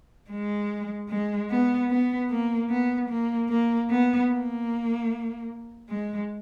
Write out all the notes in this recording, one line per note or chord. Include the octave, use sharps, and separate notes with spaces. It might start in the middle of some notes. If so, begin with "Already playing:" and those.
G#3
G#3
B3
B3
A#3
B3
A#3
A#3
B3
A#3
G#3